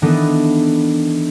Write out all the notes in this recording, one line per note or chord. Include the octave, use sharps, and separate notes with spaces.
D#3 E3 B3 D4 A4 D#5